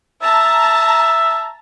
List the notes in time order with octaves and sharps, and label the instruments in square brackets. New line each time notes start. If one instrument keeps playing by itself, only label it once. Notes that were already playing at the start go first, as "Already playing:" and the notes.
[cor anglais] E5 [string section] A5 A#5